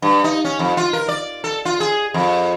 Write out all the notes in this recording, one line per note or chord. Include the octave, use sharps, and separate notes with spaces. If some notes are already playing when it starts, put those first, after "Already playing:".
G2
D#4
C#4
F2
F4
A#4
D5
A4
F4
G#4
F2